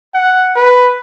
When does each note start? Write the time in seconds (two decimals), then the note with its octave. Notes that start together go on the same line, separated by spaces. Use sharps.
0.14 F#5
0.56 B4